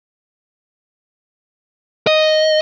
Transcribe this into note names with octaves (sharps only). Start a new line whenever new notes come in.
D#5